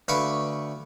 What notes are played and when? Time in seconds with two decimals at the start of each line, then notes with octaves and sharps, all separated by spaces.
0.08 D2 B4 F5 B5 C#6 D6